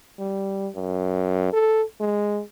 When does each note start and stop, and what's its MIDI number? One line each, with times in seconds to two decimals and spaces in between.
0.19 0.69 55
0.75 1.49 42
1.53 1.83 69
2.01 2.41 56